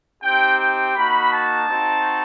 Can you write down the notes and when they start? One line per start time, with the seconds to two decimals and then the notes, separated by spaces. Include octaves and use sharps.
0.22 C4 D#4 G4 G5
0.57 G5
0.94 A#3 D#4 F#4 B5
1.30 A5
1.66 C4 D#4 F#4